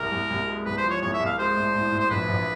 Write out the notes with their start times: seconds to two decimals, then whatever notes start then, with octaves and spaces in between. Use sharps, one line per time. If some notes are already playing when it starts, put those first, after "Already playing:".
Already playing: C2 A#4
0.11 C2
0.30 C2
0.47 G#3
0.65 C2 B4
0.77 C5
0.84 F3
0.90 C#5
1.02 C2 C#5
1.13 E5
1.20 C2
1.25 F5
1.37 G#3 C5
1.56 A2
1.75 A2
1.91 A2
2.00 C5
2.10 A#1 B4
2.28 A#1